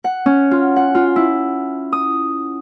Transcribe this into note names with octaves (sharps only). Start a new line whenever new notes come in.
F#5
C#4
F4
F#5
F4
E4
D#6